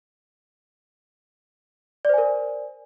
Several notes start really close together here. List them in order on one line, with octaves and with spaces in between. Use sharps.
D5 C5 G#5 A#4